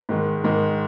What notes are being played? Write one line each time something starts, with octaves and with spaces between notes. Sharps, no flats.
G#2 D#3 G#3
G#2 D#3 G#3